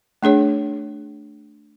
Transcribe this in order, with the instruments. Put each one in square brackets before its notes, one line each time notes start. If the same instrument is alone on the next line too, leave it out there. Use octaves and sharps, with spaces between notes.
[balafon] A3 D4 G#4 C#5